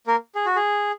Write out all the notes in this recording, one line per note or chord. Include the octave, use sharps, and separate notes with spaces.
A#3 A#4
G#4
F#4
G#4